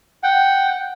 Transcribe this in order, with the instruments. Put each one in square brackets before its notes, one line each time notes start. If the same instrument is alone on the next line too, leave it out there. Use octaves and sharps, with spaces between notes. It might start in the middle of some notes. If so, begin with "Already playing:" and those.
[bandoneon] F#5 G5